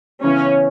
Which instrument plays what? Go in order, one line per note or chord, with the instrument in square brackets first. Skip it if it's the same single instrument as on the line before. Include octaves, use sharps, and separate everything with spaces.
[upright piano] C#3 E3 B3 E4 [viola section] C#4